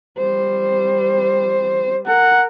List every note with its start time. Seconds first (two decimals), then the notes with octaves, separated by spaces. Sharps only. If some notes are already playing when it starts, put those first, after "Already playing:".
0.18 G3 C5
2.08 A#4 F#5